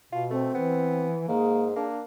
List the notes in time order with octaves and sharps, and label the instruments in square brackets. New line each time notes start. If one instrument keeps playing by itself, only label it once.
[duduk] B2 [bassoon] F4
[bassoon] A3 [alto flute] C4
[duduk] E3 [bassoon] B3
[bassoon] G#2 [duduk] A#3 [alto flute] G#4
[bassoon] A#3 [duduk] D4